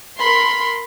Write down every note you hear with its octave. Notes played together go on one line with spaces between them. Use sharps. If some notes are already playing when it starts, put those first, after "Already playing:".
A#4 B5 C6